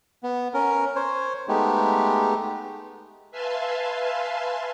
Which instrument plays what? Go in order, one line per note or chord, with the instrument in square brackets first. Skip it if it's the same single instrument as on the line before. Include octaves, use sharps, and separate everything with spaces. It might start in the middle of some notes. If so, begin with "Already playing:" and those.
[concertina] B3
C#4 A#4
C5 C#5
G#3 A3 B3 D#4 G4
[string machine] B4 E5 F5 G#5 A5 C6